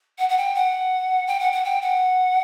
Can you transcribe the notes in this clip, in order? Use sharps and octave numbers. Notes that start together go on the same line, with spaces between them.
F#5
F#5
G5
F#5
G5
F#5
F#5
G5
F#5